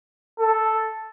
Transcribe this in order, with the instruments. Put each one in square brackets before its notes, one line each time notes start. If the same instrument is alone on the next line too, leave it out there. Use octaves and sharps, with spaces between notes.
[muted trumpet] A4